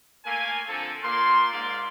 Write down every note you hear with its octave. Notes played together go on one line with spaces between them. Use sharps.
A3 A#3 F5 G#5
D3 F3 C4 A4
A#2 A#3 D5 C6
G#2 A#3 D5 F5 C6